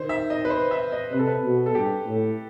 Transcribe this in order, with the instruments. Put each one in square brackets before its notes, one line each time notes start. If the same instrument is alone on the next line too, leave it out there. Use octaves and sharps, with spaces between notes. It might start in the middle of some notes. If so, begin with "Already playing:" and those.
Already playing: [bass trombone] D#3 [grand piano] C5
[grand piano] E5
D#5
B4
C5
E5
D#5
[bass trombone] C3 [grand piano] B4
[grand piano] A4
B4
[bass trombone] B2
[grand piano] A4
[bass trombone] G2 [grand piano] G4
[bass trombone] A2